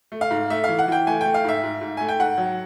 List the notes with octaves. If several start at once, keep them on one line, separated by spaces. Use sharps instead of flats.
A3
F5
G#2
A3 E5
E3 F5
F#5
E3 G5
A3 G#5
A3 G5
F5
G#2 E5
G#2
G#2
A3 G#5
G5
G#2 F#5
F#3